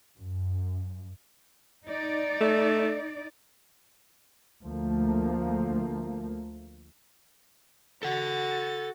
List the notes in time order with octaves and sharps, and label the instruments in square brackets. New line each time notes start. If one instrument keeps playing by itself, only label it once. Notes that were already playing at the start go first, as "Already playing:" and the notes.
[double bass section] F#2
[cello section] D#4 D5
[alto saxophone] A3
[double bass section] D2 F3 A3 A#3
[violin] F#4 A6 [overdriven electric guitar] A4 F#5